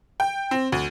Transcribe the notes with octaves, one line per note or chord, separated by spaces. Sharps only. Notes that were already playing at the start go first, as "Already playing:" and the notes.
G5
C4
D2